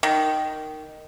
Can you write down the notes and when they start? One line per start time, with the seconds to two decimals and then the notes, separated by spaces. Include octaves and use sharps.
0.03 D#3